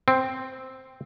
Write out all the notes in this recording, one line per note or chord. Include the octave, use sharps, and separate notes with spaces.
C4